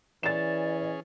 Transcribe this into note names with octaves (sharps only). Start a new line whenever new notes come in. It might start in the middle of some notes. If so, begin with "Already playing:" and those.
E3 C#4 G#4 D5 A6 E7